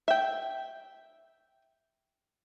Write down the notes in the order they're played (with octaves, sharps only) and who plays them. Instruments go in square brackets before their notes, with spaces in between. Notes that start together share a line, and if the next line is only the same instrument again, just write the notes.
[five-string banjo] E5 G5